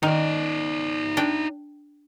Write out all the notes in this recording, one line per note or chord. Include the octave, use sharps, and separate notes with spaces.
D#3 D#4 D5
D4 G5